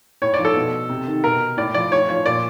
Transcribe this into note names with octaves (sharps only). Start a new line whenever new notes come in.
A2 C#5
D5
F3
A4
B2
C3
D#3
B2 A#4
A2 D5
F3 D5
A2 C#5
F3 C#5
A#2 D5